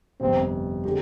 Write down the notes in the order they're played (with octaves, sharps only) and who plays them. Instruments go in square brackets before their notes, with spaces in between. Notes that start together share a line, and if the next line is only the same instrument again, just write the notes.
[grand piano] G1 F2 C3 [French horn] C4
[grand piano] D3 G#3 C4 G4